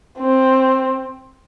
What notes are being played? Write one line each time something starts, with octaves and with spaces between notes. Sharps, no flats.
C4